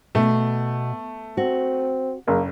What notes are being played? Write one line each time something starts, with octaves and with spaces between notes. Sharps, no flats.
B2 A3
C4 F#4
F#1 A#3